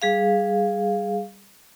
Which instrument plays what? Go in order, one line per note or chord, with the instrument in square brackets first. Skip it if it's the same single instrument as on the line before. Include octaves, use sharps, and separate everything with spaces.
[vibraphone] G3 G#4 F5